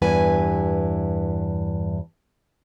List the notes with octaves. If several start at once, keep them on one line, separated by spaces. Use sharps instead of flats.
E2 G2 E4 B4 G#5